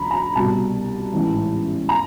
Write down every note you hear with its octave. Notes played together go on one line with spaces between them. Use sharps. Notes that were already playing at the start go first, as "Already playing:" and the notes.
Already playing: D2 C#3 F3 A#5 B5
A#5
C2 B2 A5
A1 G#2 E3
A#5